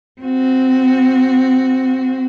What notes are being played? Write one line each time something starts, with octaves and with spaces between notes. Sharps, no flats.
C4 F#4